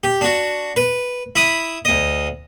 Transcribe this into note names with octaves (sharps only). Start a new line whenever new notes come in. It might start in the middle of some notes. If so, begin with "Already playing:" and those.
G4
D4 F#4
B4
E4 B5 D#6
D2 D#5